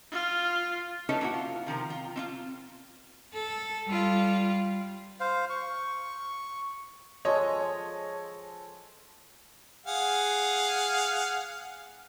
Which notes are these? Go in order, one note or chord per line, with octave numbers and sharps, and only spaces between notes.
F4 F6
C#4 D#4 E4 A4 B4 C#5
A#3 E4 F#4
F4
C3 D#3 F3 A#4
F4
C4 C#4 F4
A4
G3 F4
C5 F5
C#6
F3 G#3 A4 C#5 D#5
G#4 F5 F#5